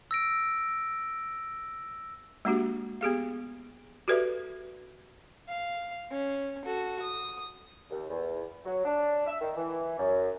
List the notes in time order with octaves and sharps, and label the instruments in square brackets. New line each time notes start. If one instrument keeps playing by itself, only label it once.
[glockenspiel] E6 A#6 D7
[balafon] G#3 A#3 D4 F#4 G4
B3 G4 G#4 F5
F#4 G4 A4 B4 D5 E5
[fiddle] F5
C#4
F#4 A4
D#6
[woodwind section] D#2
E2
F#3
D4
E5
D#3
E3
F#2